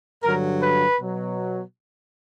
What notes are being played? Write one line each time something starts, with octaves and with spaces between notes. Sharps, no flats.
G2 D3 F#3 A#4
B4
B2 F#3